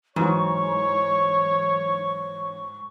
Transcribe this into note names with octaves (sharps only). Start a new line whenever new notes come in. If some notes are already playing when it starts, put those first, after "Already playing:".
G#2 E3 F#3 C#5 C#6